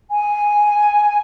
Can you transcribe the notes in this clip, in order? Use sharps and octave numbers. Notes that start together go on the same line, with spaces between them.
G#5